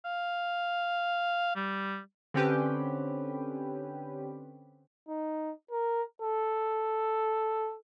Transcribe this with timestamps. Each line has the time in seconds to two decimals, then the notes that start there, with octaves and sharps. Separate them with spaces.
0.05 F5
1.55 G3
2.34 D3 C4 C#4 G4 B4
5.08 D#4
5.71 A#4
6.22 A4